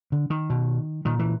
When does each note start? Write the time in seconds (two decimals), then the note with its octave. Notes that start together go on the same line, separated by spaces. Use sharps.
0.12 D3
0.30 D#3
0.50 B2
1.05 A#2 D#3
1.19 E3